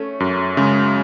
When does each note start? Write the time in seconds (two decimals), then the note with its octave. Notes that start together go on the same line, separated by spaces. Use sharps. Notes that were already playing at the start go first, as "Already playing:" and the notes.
Already playing: A3 C#4
0.20 F#2
0.57 C#3 G#3